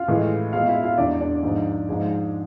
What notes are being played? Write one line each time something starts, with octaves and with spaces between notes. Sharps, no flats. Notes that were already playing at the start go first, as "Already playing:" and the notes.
Already playing: F4 F5
A2 E3 G#3
B2 G#3 F4 F5
E4 E5
F4 F5
E2 B2 G#3 D4 D5
D4 D5
G#2 F3 G#3
G#2 F3 G#3